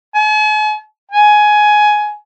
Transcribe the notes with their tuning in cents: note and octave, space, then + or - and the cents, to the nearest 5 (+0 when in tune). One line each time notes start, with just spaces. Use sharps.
G#5 +45
G#5 +15